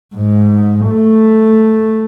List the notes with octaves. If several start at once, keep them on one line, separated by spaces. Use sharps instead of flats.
G#2
A3